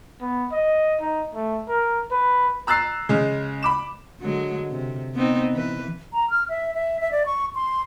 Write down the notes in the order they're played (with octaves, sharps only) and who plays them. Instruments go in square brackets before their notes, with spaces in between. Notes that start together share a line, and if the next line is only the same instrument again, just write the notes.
[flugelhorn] B3
D#5
D#4
A3
A#4
B4
[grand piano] A#5 E6 F#6 A6 C7
C#3 G#3
B5 D6 E7
[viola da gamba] D3 F#3 G#3
C3
B3 C4 D#4
E3 B4
[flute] A#5
F6
E5
E5
E5
D5
C#6
C6